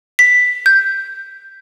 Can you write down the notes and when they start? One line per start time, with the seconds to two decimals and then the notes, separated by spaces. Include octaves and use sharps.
0.19 B6
0.66 G6